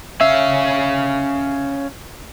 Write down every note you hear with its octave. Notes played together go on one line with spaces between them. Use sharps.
C#4 E5 F5